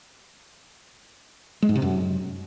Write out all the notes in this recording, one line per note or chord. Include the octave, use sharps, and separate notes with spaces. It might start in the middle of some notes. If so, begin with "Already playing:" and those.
G#3
G#2
C3
F#2